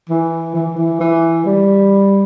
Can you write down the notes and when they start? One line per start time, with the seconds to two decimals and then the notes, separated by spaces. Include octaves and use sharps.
0.09 E3
0.55 E3
0.77 E3
1.00 E3
1.46 G3